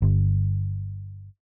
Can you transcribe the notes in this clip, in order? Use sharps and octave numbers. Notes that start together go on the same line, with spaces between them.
G1